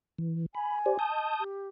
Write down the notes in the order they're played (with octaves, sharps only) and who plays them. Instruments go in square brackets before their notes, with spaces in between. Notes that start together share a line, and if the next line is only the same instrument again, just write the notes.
[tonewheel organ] E3
[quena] G#5 [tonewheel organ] B5
[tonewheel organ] G4 C5 D5
A5 D#6 G6
[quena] D#5
G4